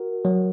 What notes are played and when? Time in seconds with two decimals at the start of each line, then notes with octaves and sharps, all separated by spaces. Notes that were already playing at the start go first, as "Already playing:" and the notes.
Already playing: F#4 A#4
0.25 F#3